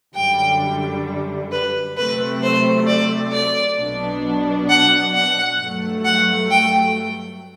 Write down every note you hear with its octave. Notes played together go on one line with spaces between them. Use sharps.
F#2 D3 G3 G5
B4
C3 F#3 A3 C4 B4
C5
D5
D5
B1 B2 F#3 B3 D4
F#5
F#5
G2 F#3 A3
F#5
G5